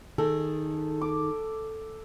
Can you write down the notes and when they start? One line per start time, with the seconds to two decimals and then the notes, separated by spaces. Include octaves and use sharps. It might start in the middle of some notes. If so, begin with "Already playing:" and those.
0.18 D#3 D#4 G#4 A4
1.01 D6